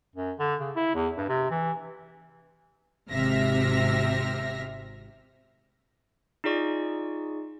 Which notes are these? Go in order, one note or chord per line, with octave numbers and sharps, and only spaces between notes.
F#2
D3
C#3
E4
E2
G2
C3
E3
G#1 C3 E5 F6 A#6
D#4 F4 G#4 D5 C#6